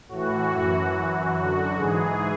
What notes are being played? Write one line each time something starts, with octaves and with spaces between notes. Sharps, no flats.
A2 E3 F#4
F#2 E3
F#2 E3
F#2 D3 F#4
G#2 E3 G#4